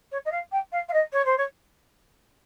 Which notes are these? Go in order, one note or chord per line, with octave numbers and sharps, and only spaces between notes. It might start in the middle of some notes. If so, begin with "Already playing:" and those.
C#5
D#5
F5
G5
F5
F5
D#5
C#5
C5
C#5